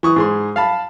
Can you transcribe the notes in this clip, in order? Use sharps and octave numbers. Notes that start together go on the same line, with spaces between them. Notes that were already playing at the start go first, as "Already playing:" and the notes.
E3 C#6 D#6
G#2 G#4 C6
F5 A5 B5